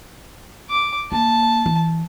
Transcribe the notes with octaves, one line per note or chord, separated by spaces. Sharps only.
D6
A#3 A5
E3